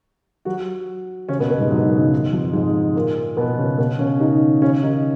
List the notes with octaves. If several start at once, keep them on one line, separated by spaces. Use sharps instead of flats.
F#3 F#4
C#3 C#4
B2 B3
B2 B3
G#2 G#3
F#2 F#3
D#3
C#3
D#3
F2 F3
G#2 G#3
A#2 A#3
B2 B3
C#3 C#4
B2 B3
C#3 C#4
D#3 D#4
C#3 C#4
D#3 D#4